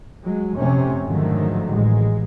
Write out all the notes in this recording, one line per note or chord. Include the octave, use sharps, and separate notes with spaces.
F#3 G#3
F2 C3 A3 C#4
G#2 D3 D#3 F3 F#3 A3
A1 G#3